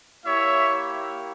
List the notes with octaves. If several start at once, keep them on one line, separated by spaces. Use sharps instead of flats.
A#3 E4 G4 C#5 E5